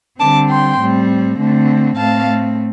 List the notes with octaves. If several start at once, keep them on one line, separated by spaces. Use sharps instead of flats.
D3 G3 C4 A5 D6
G5 C6
A2 G3 C4
D3 A3 C4
A2 A3 C4 F5 A5